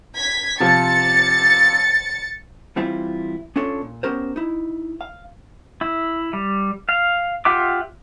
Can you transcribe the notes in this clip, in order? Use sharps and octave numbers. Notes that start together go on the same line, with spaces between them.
G#6 B6
C3 F3 A6 C#7
E3 G3 C4 E4 F4
C#4 D4 F4 A4 C#5
A#2
B3 C#4 G4 A#4 C5
D#4 E4
F5
E4
G3
F5
F4 G4 E5 F#5 D6